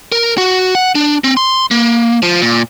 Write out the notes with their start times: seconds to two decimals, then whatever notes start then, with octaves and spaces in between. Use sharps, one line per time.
0.12 A#4
0.38 F#4
0.75 F#5
0.95 D4
1.24 C4
1.37 C6
1.71 A#3
2.23 F3
2.42 A#2